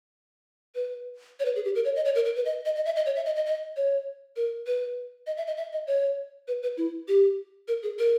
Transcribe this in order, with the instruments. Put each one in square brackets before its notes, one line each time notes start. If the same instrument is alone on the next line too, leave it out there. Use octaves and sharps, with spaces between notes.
[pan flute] B4
C#5
B4
G#4
G4
A#4
C#5
D#5
C#5
A#4
A#4
B4
D#5
D#5
D#5
E5
D#5
C#5
E5
D#5
D#5
D#5
C#5
A#4
B4
D#5
E5
D#5
E5
D#5
C#5
B4
B4
E4
G4
A#4
G#4
A#4